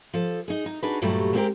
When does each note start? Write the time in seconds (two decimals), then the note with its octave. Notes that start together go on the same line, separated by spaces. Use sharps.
0.14 F3 A4
0.48 D#4 G#4
0.66 D#4
0.82 D4 D#4 F#4 G#4 B4
1.02 G2 A#2 F#3 G3 A3
1.33 G#3 A#3 C4 E4 G4 A#4